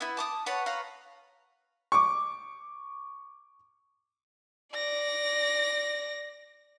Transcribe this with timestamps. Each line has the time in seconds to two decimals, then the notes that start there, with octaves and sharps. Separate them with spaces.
0.01 B3 E4
0.17 A5 D6 D#6
0.46 B4 C#5 F#5 A5
0.66 B4 C#5 F5 A#5
1.92 C#6 D6
4.73 D5 A#6